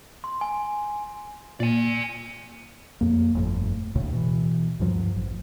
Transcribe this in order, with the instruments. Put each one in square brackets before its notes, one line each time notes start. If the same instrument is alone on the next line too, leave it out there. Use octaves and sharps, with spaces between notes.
[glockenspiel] C6
G#5
[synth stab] A#2 [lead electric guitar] D5 G#5
[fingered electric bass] F2 A#3
G1 F2 A2
D2 A2 C#3
B2 E3
D2 G2 F3 F#3
A1